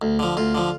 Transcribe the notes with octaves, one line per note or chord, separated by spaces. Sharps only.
D2
D3 F3
D2 F4
D3 F3